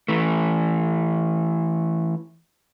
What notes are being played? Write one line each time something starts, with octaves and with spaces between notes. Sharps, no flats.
E3 A3